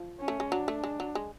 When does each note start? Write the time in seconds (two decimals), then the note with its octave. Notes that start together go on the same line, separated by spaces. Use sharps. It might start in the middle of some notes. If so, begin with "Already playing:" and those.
Already playing: F3
0.20 C#4
0.28 A3
0.40 G#3
0.51 F#3 D4
0.68 A3
0.84 G#3
1.00 F#3
1.15 G#3